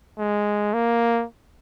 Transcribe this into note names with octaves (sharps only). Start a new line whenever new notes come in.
G#3
A#3